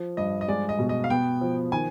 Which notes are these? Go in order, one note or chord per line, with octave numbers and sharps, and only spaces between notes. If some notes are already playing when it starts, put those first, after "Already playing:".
Already playing: F3
G2 D#5
D#5
G#3 D5
D#5
B2
D#5
F5
B3 G5
F3
D#3 G#5